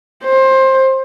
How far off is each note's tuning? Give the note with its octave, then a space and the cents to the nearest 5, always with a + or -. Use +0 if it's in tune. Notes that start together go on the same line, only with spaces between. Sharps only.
C5 +20